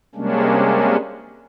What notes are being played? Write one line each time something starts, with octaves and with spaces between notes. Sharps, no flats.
C3 G3 G#3 A#3 C#4 D4